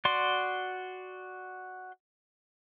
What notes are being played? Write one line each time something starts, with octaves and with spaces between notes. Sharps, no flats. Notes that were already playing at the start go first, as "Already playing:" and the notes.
F#4 D5 C6